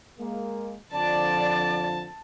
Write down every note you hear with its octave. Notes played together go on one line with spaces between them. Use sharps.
G#3 A#3
F2 D3 F3 D5 A5